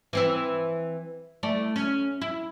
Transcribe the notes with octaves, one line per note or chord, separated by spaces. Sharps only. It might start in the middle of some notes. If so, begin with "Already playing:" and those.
E3 C4 E4
A3 E4 D5
C#4
E4